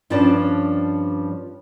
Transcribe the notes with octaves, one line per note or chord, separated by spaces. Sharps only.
G2 F3 C#4 D4 D5 A5